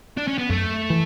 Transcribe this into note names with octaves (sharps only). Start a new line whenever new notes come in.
D4
C#4
B3
F#2 A3
E3